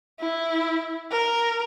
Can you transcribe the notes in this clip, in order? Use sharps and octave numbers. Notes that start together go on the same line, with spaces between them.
E4
A#4